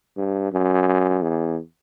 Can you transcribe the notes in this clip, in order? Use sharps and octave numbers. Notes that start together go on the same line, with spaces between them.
G2
F#2
E2